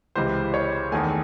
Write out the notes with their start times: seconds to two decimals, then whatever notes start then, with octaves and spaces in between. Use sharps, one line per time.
0.15 C#2 C3 E3 C5
0.54 C#5
0.91 E2 D#3 A3 G#5